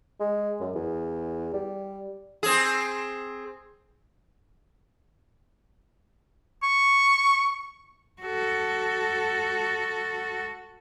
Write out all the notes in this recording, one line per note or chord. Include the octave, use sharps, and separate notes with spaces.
G#3
F#2
E2
G3
C4 G#4
C#6
F#4 A4